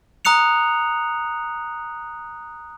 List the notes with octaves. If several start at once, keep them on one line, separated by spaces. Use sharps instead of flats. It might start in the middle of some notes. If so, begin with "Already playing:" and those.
A#5 D#6 F#6 C#7 F7